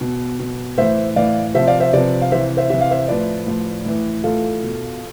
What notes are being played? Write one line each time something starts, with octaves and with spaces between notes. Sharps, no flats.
B2
B2
A2 E3 C5 E5
A2 E3 D5 F5
C3 F3 C5 E5
D5 F5
C5 E5
C3 F3 B4 D5
F5
C3 E3 C5 E5
C5 E5
C3 E3 E5
F5
C5 E5
A2 F3 B4 D5
A2 F3
A2 E3
A2 E3 F4 A4
B2